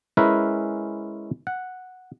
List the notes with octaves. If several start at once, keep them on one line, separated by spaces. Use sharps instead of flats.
G#3 C#4 E4 A#4 B4
F#5